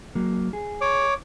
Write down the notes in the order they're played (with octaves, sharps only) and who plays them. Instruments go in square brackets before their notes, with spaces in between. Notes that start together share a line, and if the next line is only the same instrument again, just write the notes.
[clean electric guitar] F#3 A#3
G#4
[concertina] C#5 D6